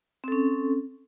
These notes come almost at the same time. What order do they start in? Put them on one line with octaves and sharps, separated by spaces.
C4 A4 C#4